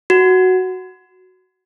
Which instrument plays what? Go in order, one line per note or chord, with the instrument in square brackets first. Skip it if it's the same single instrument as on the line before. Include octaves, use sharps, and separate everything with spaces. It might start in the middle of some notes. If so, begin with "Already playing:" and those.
[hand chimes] F#4